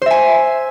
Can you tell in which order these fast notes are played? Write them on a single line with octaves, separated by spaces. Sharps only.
C5 E5 G#5